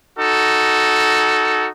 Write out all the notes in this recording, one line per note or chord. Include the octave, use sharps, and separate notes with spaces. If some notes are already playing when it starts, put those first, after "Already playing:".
D#4 F#4 A4